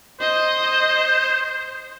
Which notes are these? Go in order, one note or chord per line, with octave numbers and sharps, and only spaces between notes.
C5 D#5